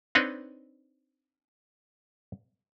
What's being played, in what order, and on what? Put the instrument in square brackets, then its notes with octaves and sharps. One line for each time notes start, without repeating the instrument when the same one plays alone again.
[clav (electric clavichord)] C4 D4 D#4 B4 C#5 D#5